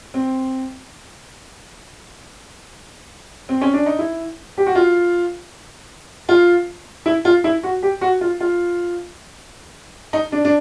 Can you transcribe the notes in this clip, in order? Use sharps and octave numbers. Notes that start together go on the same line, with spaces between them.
C4
C4
C#4
D4
D#4
E4
G4
F#4
F4
F4
E4
F4
E4
F#4
G4
F#4
F4
F4
D#4
D4
D4